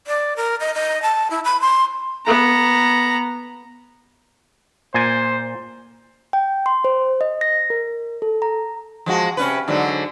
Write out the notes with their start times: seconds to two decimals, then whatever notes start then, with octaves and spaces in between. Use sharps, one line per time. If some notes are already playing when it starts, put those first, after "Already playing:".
0.07 D5
0.36 A#4
0.60 D#5
0.74 D#5
1.02 A5
1.30 E4
1.45 B5
1.61 C6
2.26 B3 A#5
4.94 A#2 C5 G#5
6.33 G5
6.66 C6
6.84 C5
7.21 D#5
7.41 A#6
7.70 A#4
8.22 A4
8.42 A#5
9.06 F3 G#3 F#4
9.37 C3 C#4 B4
9.68 G#2 D3 F#3